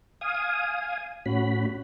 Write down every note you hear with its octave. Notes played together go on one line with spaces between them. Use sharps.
F5 G#5 D#6
A2 C#4 F#4 B5